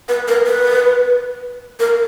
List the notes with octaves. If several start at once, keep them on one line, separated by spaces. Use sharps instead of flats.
B4
A#4
B4
A#4